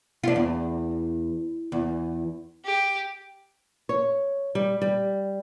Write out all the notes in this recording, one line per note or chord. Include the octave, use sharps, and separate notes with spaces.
D4 F4
E2
E2
G4
C#5
G3
G3